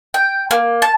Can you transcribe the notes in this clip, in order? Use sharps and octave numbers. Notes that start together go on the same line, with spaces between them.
G5
A#3
A5